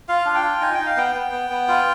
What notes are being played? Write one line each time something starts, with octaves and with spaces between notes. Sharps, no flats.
F4 F5
D4
G5
F4
D#4 G#5
D#4 G5
F5
B3 G5
B3
B3
B3
F4